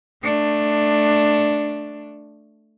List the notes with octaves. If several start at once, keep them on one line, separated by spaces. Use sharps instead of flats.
A3 D4